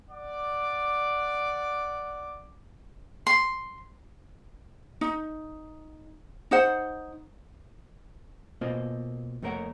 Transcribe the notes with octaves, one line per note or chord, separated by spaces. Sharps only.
D5 F#5 D6
C6
D#4
D#4 C5 F#5
B2 A#3 C4 F4 D#5
F2 A3 A#3 A#4 C#5 F#5